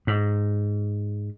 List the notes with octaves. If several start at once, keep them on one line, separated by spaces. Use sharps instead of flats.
G#2